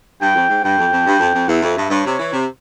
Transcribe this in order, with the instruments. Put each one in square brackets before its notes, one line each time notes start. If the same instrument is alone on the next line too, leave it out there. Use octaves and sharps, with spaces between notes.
[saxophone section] G2 [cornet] G5
[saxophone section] F2
G#2
[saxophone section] G2 [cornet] G5
[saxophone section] F2
F2
G2
F2
F2
[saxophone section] E2 [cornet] E5
[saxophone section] F2
G2
[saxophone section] G2 [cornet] C#5
[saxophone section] C3
E3
C3